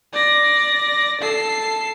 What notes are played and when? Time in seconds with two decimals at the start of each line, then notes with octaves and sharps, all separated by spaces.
0.13 D5 A#6
1.21 A4 C7